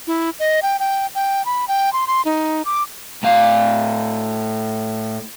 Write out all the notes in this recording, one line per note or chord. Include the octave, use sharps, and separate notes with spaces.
E4
D#5
G5
G5
G5
B5
G5
C6
C6
D#4
D6
A2 F5